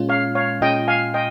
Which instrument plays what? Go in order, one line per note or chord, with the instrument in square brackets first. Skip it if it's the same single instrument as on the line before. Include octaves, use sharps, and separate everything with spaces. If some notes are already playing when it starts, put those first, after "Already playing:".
Already playing: [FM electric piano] A#2 G#3 C#4 F4
[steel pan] C#5 F5
C#5 F5
[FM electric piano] A#2 G#3 C#4 F4 [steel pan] D#5 G5
[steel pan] F5 G#5
D#5 G5